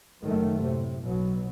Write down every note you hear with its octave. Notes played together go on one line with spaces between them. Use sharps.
F#1 F#2 D#3 F#3 A3
A2 C3
B1 B2 F#3